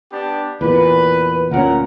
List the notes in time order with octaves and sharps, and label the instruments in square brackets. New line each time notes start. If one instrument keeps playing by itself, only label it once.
[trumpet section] B3 D4 G4
[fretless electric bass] E2 A#2 [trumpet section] B4
[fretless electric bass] D2 A#2 C#4 [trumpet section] A#4 F#5